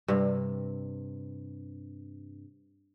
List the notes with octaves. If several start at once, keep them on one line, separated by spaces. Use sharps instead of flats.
G2 C3